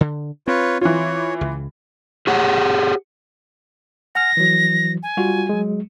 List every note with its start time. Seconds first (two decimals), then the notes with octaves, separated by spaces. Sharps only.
0.01 D3
0.48 C4 F4 B4 C#5
0.81 E3 F4 C#5
1.41 C#2 C#3
2.27 G4 G#4 C#5 F#5
4.15 F#5 G#5 F6 A#6
4.37 E3 F#3
5.03 G#5
5.17 G3 F4 F#4
5.49 F#3 G#3